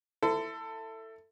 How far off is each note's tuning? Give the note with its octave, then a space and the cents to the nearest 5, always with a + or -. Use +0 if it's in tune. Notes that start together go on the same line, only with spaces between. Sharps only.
E4 +0 A4 +20 C5 -35